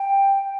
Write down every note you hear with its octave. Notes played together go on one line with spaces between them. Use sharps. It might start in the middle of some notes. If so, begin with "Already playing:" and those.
Already playing: G5